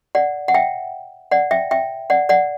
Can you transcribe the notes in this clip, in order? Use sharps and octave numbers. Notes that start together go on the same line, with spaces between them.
D5 F#5
F#5
E5 G5
D5 F#5
E5 G5
E5 G5
D5 F#5
D5 F#5